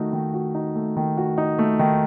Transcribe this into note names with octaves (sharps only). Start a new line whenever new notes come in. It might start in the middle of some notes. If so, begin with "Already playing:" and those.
Already playing: D#3 A3 D#4 F#4
D#3
F#4
D#4
A3
D#3
F#4
D#4
A3
D#3